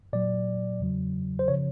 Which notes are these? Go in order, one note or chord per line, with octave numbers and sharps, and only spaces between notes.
A#2 F#3 D5
E2 C#3 F#3
C5
C#3 F3 C#5